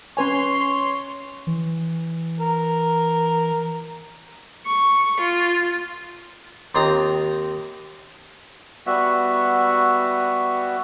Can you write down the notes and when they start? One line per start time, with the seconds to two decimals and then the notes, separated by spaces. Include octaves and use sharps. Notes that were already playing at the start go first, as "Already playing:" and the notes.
0.17 C#4 B4 C#5 G#5 C6
1.47 E3
2.40 A#4
4.66 C#6
5.20 F4
6.75 D#2 A#3 C4 F4 D#5 A#5
8.86 G3 B3 F#4 E5